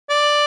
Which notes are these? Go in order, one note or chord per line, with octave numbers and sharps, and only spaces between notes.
D5